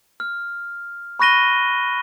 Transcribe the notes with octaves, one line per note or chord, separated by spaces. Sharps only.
F6
B5 C#6 F#6 A#6 D#7 G7